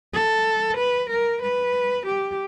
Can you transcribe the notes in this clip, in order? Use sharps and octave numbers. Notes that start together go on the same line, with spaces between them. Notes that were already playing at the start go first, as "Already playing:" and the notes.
A4
B4
A#4
B4
G4